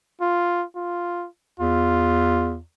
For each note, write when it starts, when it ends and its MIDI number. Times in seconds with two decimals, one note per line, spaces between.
0.21 0.64 65
0.76 1.27 65
1.60 2.60 40
1.60 2.58 65